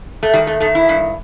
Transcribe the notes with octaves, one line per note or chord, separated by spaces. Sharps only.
A3
D#3 G3
A3
D#3 A3
E4
G2